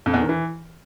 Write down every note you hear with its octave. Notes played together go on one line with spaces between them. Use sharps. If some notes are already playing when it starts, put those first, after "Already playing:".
F2
E2
D#3
E3